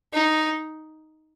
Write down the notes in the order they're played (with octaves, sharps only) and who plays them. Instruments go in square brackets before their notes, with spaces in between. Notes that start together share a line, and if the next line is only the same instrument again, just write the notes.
[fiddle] D#4